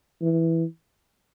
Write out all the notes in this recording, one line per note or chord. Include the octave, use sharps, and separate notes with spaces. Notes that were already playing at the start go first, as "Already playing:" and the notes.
E3